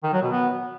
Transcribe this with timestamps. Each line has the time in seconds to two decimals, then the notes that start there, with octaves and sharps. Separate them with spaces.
0.03 D#3
0.13 F#3
0.23 B2
0.32 B3